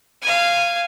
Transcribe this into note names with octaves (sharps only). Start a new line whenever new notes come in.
F5 G#5